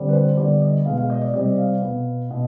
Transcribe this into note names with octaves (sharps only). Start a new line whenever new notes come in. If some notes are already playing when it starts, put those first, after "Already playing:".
Already playing: D3 G3 C4
B4
C5
D3 G3 B3 D5
D#5
B2 G#3 B3 F5
F5
D#5
D5
C3 G3 C4 D#5
F5
B2 B3
B2